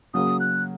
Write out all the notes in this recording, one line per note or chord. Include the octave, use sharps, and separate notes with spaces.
C#3 F#3 A#3 D#6
F#6